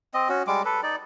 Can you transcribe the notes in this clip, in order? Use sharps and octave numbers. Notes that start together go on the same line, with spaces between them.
C4 D#5
C#4 F#4
G3 G#3 D6
A4 B4
D#4 D5